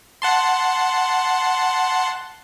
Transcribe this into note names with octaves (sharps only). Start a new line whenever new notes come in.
F#5 A5 C6